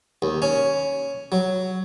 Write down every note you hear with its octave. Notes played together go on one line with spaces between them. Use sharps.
D#2
C#4
F#3